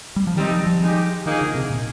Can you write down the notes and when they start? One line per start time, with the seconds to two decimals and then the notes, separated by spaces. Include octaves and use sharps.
0.16 G3
0.27 F3
0.36 C3 D#3 G3 C4 D#4
0.51 F3
0.66 F3
0.81 G#3 D#4 G4
1.26 D#3 F3 A#3 D#4 G#4
1.41 D3
1.55 C3
1.70 A#2